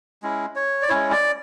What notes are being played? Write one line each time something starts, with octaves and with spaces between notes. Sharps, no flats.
G#3 C#4 E4
C#5
D5
G#3 C#4 E4 C#5
D5